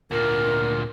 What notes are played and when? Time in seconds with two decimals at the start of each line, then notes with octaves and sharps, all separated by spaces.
0.11 D2 A#2 A#4